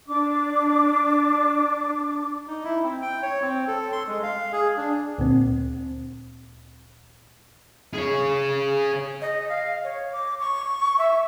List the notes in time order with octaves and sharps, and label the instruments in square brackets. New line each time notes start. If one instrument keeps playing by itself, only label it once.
[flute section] D4 D6
[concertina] D#4
E4
C4
G5
C#5
C4
A4
C6
G#3
F5
G#4
D4
[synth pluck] D2 A#2 C4
[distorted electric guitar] G#4 C#5
[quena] D#5
F5
C#5
D6
C#6
E5